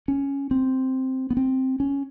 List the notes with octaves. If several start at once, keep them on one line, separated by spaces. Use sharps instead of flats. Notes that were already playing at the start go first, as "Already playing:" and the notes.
C#4
C4
B3
C4
C#4